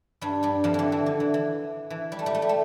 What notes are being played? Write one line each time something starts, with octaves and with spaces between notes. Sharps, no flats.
G2 G3
G2 G3
F2 F3
D3 E3
E3
D3
E3
E3
E3
G3
A3
G3
A3
G3
A3